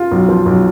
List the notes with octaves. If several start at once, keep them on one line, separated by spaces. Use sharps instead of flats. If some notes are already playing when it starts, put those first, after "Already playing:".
Already playing: F4
B1
F3
B1